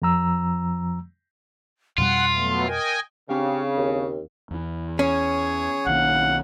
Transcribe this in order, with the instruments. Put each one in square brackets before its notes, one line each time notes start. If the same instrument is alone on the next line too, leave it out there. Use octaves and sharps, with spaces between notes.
[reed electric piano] F2 F3 A#5 E6
[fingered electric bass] F2 B2 G3 [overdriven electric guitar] F4 [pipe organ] F#5 [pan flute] C6
[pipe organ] F#3 A3 B3
[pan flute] A#4 [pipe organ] D#5 G5 G#5
[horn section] C#3 [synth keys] C4 D4 F5 [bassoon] G4
[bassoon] D#2
[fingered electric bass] E2 E3
[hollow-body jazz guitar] C#4 [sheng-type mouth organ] G#4 C#5
[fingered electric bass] B1 D#3 A#3 [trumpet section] F5 F#5